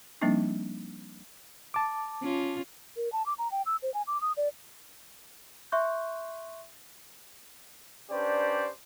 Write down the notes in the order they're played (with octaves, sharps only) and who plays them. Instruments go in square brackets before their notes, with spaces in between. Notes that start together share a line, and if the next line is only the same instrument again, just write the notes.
[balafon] F3 G3 A#3 C4 D4 D#4
[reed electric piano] A5 D6
[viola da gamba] C#4 F4
[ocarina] A#4
A5
D6
A#5
G5
E6
C5
G#5
D6
D#6
D5
[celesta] E5 C6 C#6 F#6 G6
[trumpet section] C#4 D4 G4 B4 C5 D5